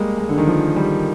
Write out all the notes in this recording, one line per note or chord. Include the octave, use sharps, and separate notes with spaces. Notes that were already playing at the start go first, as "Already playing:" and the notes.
Already playing: G3 G#3 A#3
G#3
D3
D#3
F3
G3